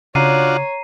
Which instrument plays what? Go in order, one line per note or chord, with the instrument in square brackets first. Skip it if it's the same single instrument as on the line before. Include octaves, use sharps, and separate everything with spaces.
[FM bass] C#3 [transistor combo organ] D4 F4 F#4 [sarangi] C#5 [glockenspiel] A#5 C7 D#7